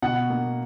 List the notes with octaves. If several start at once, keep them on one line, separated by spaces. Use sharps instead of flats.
B2 F#5
A#3